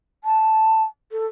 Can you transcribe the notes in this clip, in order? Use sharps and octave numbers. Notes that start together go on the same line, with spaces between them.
A5
A4